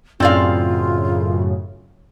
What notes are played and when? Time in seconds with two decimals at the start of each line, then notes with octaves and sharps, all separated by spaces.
0.20 F#2 A2 C#3 C4 F4 D5 F5